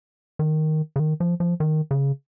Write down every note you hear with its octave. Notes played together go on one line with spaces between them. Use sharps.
D#3
C#3
D#3
F3
F3
D#3
C#3